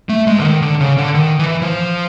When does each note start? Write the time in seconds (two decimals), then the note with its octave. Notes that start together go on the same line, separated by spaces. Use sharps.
0.09 A3
0.27 G#3
0.39 D3
0.45 D#3
0.62 D3
0.80 C#3
0.98 D3
1.15 D#3
1.39 E3
1.62 F3